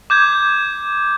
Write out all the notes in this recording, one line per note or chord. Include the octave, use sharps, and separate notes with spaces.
D6 G6 G#6